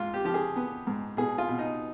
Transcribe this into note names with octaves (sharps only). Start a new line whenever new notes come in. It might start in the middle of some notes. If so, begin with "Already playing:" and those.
Already playing: G#2 F4
G4
F3 G4
G#4
B3
G#2
B2 G#4
F4
B2
D#4